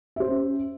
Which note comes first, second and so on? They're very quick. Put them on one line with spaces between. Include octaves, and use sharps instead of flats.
E5 C5 G4 C#4